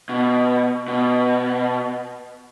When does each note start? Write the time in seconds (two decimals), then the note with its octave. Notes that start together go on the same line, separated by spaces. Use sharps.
0.09 B2
0.88 B2